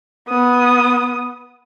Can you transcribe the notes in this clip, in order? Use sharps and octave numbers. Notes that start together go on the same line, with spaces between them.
B3 D#6